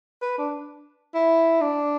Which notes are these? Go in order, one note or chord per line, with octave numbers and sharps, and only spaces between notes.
B4
D4
E4
D4